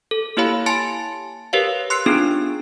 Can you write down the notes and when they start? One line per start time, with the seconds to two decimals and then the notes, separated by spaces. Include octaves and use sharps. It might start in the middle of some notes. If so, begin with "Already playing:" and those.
0.11 A4
0.37 A#3 E4 G4 C#5 F5 B5
0.66 G#5 A5 C6 A6 C#7 D7
1.53 G4 A#4 B4 C#5 F5
1.90 C6 E6 F#6 C7 C#7
2.06 B3 C4 D4 D#4 F4 G#4